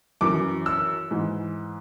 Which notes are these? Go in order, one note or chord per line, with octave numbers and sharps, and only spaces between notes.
F#2 E3 D6
E6
G#2 E3